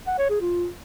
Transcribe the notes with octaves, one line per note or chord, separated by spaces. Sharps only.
F#5
C#5
G#4
F4